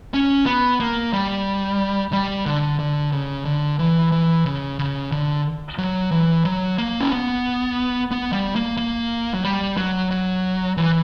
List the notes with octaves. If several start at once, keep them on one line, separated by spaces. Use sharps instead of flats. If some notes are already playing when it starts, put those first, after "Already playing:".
C#4
B3
A#3
G3
G3
D3
D3
C#3
D3
E3
E3
C#3
C#3
D3
F#3
E3
F#3
A#3
C#4
B3
B3
G3
A#3
A#3
F#3
G3
F#3
F#3
E3